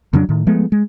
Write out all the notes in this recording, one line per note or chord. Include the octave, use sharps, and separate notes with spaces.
F2 C#3 F#3 D4
A2 D#3
F3 G#3 A3 B3
G#3